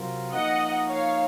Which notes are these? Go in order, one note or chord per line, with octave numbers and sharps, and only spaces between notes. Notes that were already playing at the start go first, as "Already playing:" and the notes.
Already playing: C3 F#3 C4 F4 A#4
F3 A#3 D#4 A#4 D#5 F#5
C#5 F5